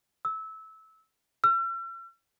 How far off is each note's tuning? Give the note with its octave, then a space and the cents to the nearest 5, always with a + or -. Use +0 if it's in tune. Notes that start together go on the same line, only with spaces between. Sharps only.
E6 -20
E6 +45